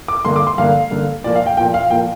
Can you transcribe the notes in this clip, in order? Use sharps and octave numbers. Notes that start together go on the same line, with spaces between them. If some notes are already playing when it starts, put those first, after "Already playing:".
D6
G2 D3 A#3 C6
D6
C6
G2 D3 A#3 F5
G2 D3 A#3
A#2 F3 A#3 D5
F5
G5
A#2 F3 A#3 G5
F5
A#2 F3 A#3 G5